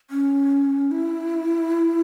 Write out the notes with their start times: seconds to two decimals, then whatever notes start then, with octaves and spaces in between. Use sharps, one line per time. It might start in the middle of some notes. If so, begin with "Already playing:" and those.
0.10 C#4
0.91 E4